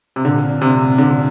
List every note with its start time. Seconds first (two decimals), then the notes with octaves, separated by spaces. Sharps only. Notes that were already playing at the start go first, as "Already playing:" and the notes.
0.16 C3
0.25 A#2 D3
0.61 C3
0.98 D3